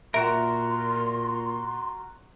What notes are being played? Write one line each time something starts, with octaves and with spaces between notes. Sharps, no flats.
A#2 F#4 A#4 E5 G5 C6